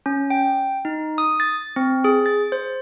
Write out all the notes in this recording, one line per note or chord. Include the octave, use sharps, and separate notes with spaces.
C#4
G5
D#4
D#6
A6
C4
G#4
A6
C5